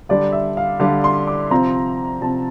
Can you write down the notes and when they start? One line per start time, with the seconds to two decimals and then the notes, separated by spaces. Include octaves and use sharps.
0.09 D3 G3 D4 D5
0.32 E5
0.57 F5
0.80 D3 G3 D4 F5
1.04 C6
1.27 D6
1.51 C3 F3 C4 A#5
2.21 C3 F3 C4 A5